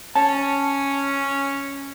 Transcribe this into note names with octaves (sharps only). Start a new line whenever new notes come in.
C#4 A5